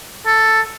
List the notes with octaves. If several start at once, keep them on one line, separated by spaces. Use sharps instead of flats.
A4